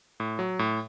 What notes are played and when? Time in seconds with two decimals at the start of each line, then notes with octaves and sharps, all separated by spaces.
0.20 A2
0.39 F#3
0.59 A2